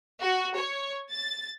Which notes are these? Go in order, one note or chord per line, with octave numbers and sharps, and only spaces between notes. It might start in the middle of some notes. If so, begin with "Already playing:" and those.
F#4
C#5
A6